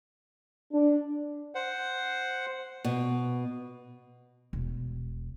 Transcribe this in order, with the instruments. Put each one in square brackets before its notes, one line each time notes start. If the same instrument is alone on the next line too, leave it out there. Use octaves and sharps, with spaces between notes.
[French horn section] D4
[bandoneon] C5 F#5
[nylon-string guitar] B2
[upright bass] E1